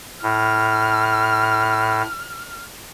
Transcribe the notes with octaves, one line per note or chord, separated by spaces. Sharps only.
A2 F6